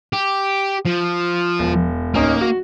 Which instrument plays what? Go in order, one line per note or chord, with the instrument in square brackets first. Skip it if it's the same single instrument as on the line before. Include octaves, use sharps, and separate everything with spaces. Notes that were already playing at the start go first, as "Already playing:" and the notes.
[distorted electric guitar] G4
F3
[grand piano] E1
[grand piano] D1 C#4 D#4 [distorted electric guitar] A#3
[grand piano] F#4